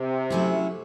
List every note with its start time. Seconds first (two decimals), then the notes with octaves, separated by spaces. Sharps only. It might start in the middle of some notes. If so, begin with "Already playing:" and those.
Already playing: C3
0.30 F#3 A3 C#4 E4